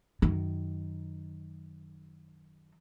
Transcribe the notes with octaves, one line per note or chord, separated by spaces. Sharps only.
F#2 D#3